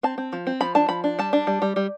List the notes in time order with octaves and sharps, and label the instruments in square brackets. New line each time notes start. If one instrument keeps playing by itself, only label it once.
[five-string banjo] C4 A5
C4
F3
C4
F3 B5
D4 A5
F3 B5
D4
G3 A5
D4
G3
G3
G3